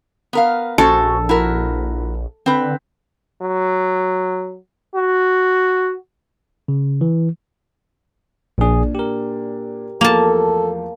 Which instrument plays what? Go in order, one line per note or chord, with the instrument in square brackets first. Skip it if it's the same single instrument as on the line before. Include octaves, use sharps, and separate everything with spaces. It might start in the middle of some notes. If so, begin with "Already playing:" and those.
[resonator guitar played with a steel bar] B3 A#4 F5
[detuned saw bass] A#1 [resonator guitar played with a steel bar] C#4 F#4 C5 [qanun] A4
[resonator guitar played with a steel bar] E4 F#4 A#4
[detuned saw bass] D3 [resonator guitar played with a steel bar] C4 B4
[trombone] F#3
F#4
[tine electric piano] C#3
E3
[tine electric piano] A#1 G#4 [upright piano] A#2 D4
[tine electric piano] G4 A#4
[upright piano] E2 F3 A3 [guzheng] A#3 A5 [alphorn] A4